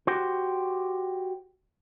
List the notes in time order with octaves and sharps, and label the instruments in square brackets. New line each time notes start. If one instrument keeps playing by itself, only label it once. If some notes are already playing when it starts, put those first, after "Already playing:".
[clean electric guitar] F#4 G4 C5